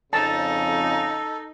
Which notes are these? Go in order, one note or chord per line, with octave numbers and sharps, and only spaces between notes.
F2 C#3 D#4 A4 A5